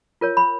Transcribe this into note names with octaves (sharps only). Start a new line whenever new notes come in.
F4 A#4 C#5
B5